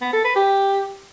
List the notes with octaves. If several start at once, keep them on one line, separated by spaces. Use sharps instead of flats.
B3
A4
B4
G4